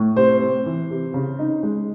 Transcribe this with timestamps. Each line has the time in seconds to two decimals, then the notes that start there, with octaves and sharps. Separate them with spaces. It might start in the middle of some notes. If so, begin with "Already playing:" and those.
Already playing: A2
0.16 C3 C5
0.40 C4
0.66 E3
0.90 C3
1.14 C#3
1.39 D#4
1.63 G#3